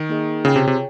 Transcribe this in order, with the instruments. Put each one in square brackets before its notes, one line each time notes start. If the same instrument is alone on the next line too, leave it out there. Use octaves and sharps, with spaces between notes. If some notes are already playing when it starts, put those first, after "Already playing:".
Already playing: [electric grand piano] D#3
[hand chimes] A#3 D#4 G#4 D#5
[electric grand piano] C#3 [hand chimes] F4 G#4 C#5 G5
[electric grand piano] C3
C3